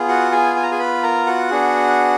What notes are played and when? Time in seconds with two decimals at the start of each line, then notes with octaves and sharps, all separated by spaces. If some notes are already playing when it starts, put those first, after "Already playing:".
Already playing: B3 F4 G#4
0.08 F#4 F#5
0.32 G#4 G#5
0.56 G#5
0.63 A#5
0.71 G#4 G#5
0.79 B4 B5
1.03 A#4 A#5
1.26 F#4 F#5
1.51 B3 D4 G#4